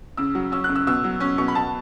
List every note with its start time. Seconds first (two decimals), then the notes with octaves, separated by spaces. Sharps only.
0.17 C#3 E6
0.35 F#3
0.52 C#4 E6
0.64 C#3 F#6
0.76 E6
0.87 B2 E6
1.04 F#3
1.20 C#4
1.38 B2 C#6
1.48 B5
1.55 B2 A5